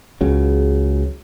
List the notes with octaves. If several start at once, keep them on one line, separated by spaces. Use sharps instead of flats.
C#2 C#3 F#3